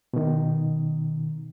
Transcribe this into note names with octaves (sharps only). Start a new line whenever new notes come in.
B2 D#3